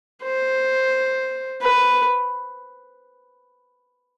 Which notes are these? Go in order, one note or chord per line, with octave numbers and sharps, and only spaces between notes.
C5
B4